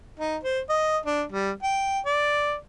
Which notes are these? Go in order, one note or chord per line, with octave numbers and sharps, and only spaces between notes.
D#4
C5
D#5
D4
G3
G5
D5